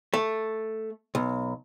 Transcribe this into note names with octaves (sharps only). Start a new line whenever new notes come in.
A3
B1